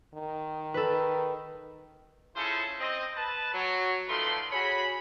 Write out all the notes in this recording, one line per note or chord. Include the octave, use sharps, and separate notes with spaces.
D#3
A4 B4
C#4 E4 F4 G#4 A4 C5
C4 D#5
B4 A5
F#3
D#3 F3 A3 B4 D5 C6
F#4 G#4 C#5 B5